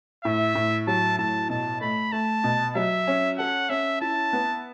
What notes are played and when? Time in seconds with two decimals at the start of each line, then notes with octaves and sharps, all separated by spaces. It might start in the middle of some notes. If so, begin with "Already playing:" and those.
0.24 A2 E5
0.55 A2
0.87 F#3 A5
1.18 A2 A5
1.49 B2 A5
1.81 A3 B5
2.12 A3 A5
2.44 B2
2.75 F#3 E5
3.07 C#4
3.38 A4 F#5
3.69 C#4 E5
4.01 E4 A5
4.33 B3